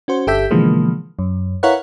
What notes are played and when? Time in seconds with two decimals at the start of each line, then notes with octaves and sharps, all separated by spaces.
0.08 C#4 F#4 C5
0.27 G1 G4 A4 E5 G6 B6
0.51 B2 D3 E3 F3 G#3 A#3
1.19 F#2
1.63 E4 A#4 B4 C#5 F5 F#5